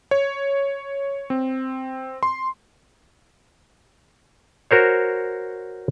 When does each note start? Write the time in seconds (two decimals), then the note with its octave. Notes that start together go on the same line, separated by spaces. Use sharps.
0.11 C#5
1.30 C4
2.23 C6
4.71 F#4 A#4 C5 C#5